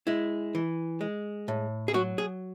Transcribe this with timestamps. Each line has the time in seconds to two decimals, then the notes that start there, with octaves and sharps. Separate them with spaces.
0.07 G#3 E4
0.55 E3
1.01 G#3
1.48 A2
1.88 G#4
1.94 F#3 F#4
2.18 G#4